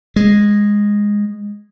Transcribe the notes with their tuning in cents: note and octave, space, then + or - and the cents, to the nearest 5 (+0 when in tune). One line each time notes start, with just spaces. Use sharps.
G#3 -10